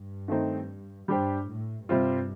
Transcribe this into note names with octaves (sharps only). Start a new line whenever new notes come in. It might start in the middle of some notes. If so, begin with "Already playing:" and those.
Already playing: G2
D#3 A3 C4 D#4
G2 G3 D4 G4 C5
A2
G2 C3 G3 C4 F4